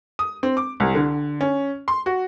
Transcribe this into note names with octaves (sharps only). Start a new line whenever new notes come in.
D#6
C4
D6
C2
D3
C#4
C6
F#4